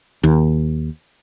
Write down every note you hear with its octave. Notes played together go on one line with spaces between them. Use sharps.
D#2